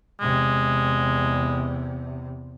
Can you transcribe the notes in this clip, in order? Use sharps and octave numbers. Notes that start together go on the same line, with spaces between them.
E2 C3 G#3